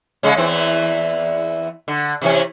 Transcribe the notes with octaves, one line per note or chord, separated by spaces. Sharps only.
C#3 G#3 C#4
E2 E3 C4
D3
C3 E3 C#4